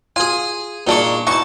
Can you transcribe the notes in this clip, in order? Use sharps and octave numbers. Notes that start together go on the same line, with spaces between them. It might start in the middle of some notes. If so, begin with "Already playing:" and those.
F4 G#4 G#5
A#2 G#3 D4 D#4 C#6
E3 D#4 F#4 A5 C#6